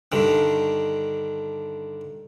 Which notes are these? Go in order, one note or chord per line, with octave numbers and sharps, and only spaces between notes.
G2 D3 D#3